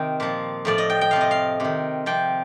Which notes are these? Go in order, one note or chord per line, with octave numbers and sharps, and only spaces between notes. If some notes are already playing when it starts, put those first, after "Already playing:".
Already playing: C3 D#3 D#5 G5
A#2 F3
A2 F3 D5
D#5
G5
G5
C3 F3 F5
D#5
F5
C3 D#3
C3 F3 G5